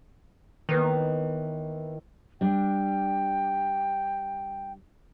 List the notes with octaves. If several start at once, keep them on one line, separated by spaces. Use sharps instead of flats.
D#2 D#3 E3 B3
G3 D4 G5